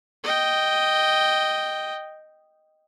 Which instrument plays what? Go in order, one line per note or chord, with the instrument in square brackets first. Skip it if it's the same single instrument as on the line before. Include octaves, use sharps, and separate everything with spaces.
[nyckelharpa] D#5 G5